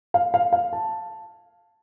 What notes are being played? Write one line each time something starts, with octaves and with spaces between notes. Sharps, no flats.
F5
F5
F5
A5